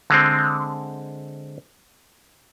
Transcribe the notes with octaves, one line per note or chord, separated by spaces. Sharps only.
D3 G#3 C4